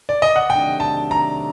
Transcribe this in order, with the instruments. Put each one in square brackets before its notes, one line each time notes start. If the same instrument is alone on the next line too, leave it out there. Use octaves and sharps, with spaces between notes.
[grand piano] D5
D#5
F#5
[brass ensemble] C3 D#3 F#3 A3 D4 [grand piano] G5
[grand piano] A5
A#5